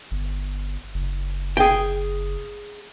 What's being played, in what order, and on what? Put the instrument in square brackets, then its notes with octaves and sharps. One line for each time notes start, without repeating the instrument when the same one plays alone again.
[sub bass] G1
F#1
[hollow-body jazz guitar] G#4 G5